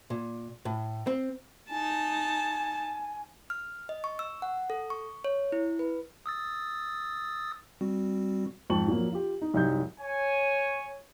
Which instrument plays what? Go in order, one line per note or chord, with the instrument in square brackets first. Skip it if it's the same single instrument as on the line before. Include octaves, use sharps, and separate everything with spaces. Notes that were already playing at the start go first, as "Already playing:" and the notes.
[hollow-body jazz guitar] A#2
A2
C4
[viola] D#4 A5 [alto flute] G#5
[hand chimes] F6
D#5
C#6
E6
F#5
A4
C#6
C#5
E4
B4
[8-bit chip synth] D#6 E6 A6
G3 C4 F#4
[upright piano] F2 G#2 F3 A5 C#6 F#7
A#2 F3 F#3 A#3
F4 G4
D#4
C2 F#2 D#4 E5 G6
[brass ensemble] C#5 G#5